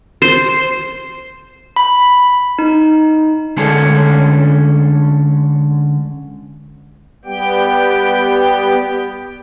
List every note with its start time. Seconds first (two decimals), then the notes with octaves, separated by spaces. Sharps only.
0.22 C5
1.76 B5
2.59 D#4
3.57 D3 G#3 C#4 D4 G#4 A4
7.25 G3 B3 G4 G5